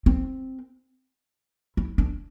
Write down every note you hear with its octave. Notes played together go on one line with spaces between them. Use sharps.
C4
E4
D4